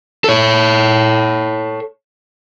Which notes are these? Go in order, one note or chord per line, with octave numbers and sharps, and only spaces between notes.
A4 C#5